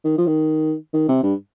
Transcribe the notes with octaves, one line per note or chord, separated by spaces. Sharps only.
D#3
F3
D#3
D#3
C3
G2